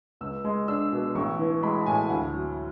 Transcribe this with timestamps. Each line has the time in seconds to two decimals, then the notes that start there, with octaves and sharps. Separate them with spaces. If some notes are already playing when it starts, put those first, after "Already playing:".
0.21 C#2 E6
0.44 G#3
0.68 D4 E6
0.92 B2
1.15 A1 C#6
1.39 E3
1.63 G#3 B5
1.81 A5
1.86 A2 G#5
2.10 D2 F#5
2.34 F#3